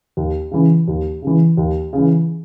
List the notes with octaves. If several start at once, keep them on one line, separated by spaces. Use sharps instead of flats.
D#2
C#3 E3
D#2
C#3 E3
D#2
C#3 E3